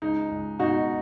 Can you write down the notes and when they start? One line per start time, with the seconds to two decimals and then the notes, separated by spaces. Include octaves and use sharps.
0.02 C#2 D#4
0.31 C#2
0.59 B2 D#4 F#4